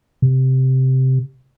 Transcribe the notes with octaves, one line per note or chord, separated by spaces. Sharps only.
C3